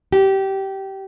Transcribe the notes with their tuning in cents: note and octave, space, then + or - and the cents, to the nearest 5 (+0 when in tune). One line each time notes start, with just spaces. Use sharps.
G4 -20